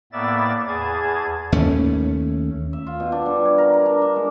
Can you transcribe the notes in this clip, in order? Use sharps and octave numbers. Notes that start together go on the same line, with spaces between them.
A2 A#3 B3 D5 E5 A6
E2 G#4 A5 G#6
D#2 A3 C#4
E5
F4
B2
D4
G3
C#5
A#4
A#4
D4
D4
G#3